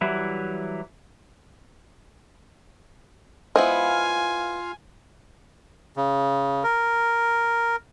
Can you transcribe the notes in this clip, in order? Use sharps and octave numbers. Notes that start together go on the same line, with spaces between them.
E3 F#3 G3 E4
G#3 B3 E4 F4 C5 D#5 F5 G#5
C#3
A#4